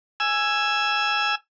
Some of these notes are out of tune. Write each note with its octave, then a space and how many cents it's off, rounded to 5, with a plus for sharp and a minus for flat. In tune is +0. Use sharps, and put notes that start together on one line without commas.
G#5 +0 E6 +15